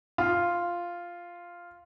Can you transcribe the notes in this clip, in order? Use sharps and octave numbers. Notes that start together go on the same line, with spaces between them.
F4